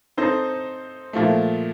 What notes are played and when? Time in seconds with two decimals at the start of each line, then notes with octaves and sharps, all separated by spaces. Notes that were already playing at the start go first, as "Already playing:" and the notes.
0.17 C4 D#4 A4 C5 D#5
1.13 A#2 F3 A3